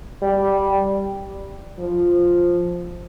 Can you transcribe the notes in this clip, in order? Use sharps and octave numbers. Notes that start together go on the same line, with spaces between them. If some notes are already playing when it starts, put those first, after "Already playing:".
G3
F3